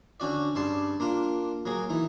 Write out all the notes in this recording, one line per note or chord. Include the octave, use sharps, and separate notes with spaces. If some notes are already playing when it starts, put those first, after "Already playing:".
D3 C#4 F#4 D5
G2 C#3 D5 A5 C6
A#3 D4 F4
F#3 A#3 G#4
E3 D#4